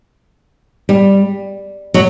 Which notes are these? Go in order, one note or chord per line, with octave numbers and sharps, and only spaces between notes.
G3
F#3